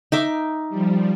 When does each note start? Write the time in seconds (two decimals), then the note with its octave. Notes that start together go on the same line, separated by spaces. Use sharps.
0.12 D#4 E5 D6
0.70 F3 G3